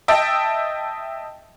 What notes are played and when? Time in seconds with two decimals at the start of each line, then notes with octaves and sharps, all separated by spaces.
0.08 D#5 E5 G5 A5